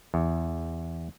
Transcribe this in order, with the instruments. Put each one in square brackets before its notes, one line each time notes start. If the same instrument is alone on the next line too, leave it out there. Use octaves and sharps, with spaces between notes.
[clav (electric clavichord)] E2